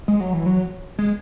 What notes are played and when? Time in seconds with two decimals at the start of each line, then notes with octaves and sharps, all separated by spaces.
0.08 G#3
0.20 F#3
0.33 E3
0.46 F#3
0.99 G#3